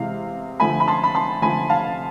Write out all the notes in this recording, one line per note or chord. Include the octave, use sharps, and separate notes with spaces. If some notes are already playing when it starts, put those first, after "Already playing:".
Already playing: C3 E3 G#3 F5
D3 F3 A3 G#5 B5
B5
A5 C6
B5
A5 C6
D3 F3 A3 G#5 B5
F5 A5